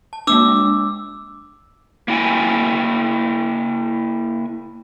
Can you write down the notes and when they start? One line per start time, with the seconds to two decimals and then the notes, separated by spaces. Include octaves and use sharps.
0.13 A5
0.27 G#3 A#3 D4 D6 E6
2.08 A#3 E4 G5 G#5